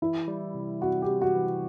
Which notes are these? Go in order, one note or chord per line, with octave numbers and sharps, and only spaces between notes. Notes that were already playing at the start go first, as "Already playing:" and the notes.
E3 E4
G3
C3
C3 F#4
G4
C3
F#4
E3